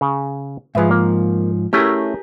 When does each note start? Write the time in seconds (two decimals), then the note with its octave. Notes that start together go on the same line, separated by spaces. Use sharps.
0.01 C#3
0.75 G#2 F3 G#4 B4 E5
0.91 A#3
1.73 A3 C#4 E4 G4 G#4 A#4